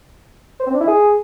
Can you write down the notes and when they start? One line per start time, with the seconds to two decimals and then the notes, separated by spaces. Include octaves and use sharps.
0.59 C5
0.66 C4
0.73 D4
0.80 E4
0.87 G#4